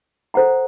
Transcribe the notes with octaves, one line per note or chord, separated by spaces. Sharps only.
A4 C5 F#5 A#5